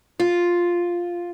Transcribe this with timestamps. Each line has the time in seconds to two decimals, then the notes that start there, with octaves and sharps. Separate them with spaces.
0.20 F4